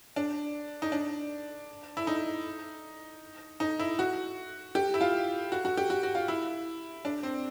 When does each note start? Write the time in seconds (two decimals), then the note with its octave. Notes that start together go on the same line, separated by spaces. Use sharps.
0.16 D4
0.82 D#4
0.92 D4
1.97 E4
2.07 D#4
3.60 D#4
3.79 E4
3.99 F#4
4.75 G4
4.94 E4
5.01 F4
5.52 F#4
5.65 F#4
5.77 G4
5.90 F#4
6.03 F#4
6.15 F4
6.28 E4
7.05 D4
7.23 C4